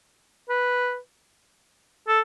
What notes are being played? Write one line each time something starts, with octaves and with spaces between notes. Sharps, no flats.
B4
A4